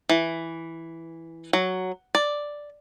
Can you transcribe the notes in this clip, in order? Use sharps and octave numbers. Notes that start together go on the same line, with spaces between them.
E3
F#3
D5